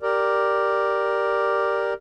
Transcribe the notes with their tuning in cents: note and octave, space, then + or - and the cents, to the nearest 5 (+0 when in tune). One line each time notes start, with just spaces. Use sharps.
G4 +0 A#4 +0 D5 +0